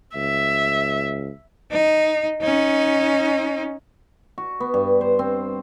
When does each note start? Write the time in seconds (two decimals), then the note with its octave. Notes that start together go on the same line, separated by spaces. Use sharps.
0.15 C#2 E5
1.71 D#4
2.42 C#4 D#4
4.38 F#4
4.60 B3
4.74 G2
5.01 C5
5.19 C4